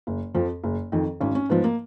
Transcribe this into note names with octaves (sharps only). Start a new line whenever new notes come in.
F#1
F2 F3
F#1
F2 D#3
G#1 C#4
C#4
G#2 F3 B3
A#3